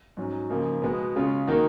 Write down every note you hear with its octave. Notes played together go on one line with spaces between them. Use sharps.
G#2 F#3 C#4
C#3 F3 A#3 D#4
B2 G#3 B3
C#3 G#3 C#4 F4
D#3 A#3 D#4 F#4